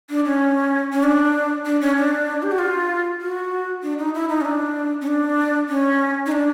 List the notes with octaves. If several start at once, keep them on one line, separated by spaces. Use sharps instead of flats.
D4
C#4
C#4
D4
D4
C#4
D4
G4
F#4
F4
F#4
D4
D#4
E4
D#4
C#4
D4
C#4
D4
C#4
D#4
D4